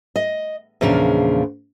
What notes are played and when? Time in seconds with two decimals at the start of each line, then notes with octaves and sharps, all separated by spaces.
0.16 D#5
0.81 E2 A#2 C#3 F3 D4